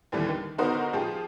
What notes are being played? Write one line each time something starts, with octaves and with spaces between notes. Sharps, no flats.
D#2 D3 E3 G3
D#3
D3 B3 D#4 F#4 A#4 C5
F3 F4 G4 G#4